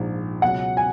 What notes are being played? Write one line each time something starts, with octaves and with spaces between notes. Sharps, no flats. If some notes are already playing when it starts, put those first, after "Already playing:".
Already playing: A#1 G#2 F3
C#2 B2 F#3 C#4 F#5
G#5